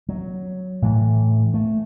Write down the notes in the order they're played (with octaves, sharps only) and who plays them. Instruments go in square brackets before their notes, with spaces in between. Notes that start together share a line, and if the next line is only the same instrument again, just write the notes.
[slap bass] F#3
A2 E3
A3